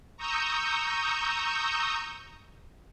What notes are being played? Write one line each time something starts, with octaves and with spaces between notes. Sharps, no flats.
A#5 C#6 D#6 E6 G6